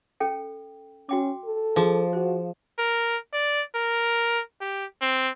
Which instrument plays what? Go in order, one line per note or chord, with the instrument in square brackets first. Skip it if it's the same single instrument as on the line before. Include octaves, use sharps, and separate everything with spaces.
[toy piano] C#4 A4 G5
[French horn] C#4 [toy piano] F#4 G5 D6
[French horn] A4
[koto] F3 [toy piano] G#4 D6
[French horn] F#4 [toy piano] C5
[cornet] A#4
D5
A#4
G4
C4